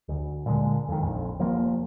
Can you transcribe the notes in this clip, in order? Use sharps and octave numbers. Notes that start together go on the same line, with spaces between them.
D2
A#2 D3 E3 G#3
F2 D#3
A#1 F2
F1 F3 A#3